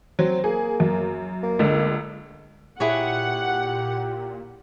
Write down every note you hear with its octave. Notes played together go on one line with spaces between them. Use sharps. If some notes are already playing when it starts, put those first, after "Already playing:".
F#3 C4
A#3 G#4
F#2
A#3
C#2 D3
A#2 E4 G4 G#4 C#5 F#5